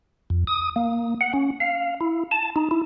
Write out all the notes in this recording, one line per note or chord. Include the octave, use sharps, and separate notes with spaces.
F2
D#6
A#3
F#5
C#4
F5
E4
A5
D#4
E4